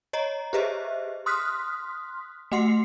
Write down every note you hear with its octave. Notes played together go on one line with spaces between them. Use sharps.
C#5 D#5 A#5
G4 G#4 B4 C5 D#5 E5
C6 D#6 F6 F#6 B6
A3 F#4 F#5 C6 C7 C#7